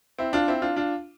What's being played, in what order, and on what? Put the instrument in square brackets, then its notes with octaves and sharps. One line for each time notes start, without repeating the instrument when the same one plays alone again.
[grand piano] C4 E4
D4 F4
C4 E4
D4 F4
D4 F4